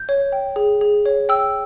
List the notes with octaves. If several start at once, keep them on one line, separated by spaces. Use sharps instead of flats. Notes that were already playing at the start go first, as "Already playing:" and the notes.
Already playing: G6
C#5
G5
G#4
G#4
C#5
G5 E6